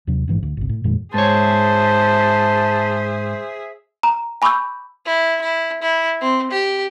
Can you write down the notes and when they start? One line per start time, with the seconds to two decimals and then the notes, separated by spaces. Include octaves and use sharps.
0.07 D#2 C3 F#3
0.28 A1 G#2 E3
0.43 D2
0.57 G1 C2
0.69 A2
0.84 F2 A#2 D#3 G#3
1.14 G#2 G#4 C5 C#5 E5 A5
4.03 A#5
4.42 G#5 B5 C#6 D6 E6 G6
5.06 E4
5.42 E4
5.82 E4
6.21 C4
6.51 G4